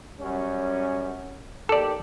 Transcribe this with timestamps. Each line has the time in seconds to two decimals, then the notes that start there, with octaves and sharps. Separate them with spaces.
0.20 F#2 G3 C#4
1.69 G#2 A#3 G4 A4 D5